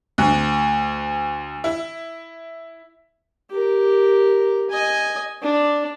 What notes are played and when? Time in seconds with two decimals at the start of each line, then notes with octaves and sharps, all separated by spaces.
0.18 D2
1.64 E4
3.51 G4 A#4
4.70 D#5 G#5
5.42 D4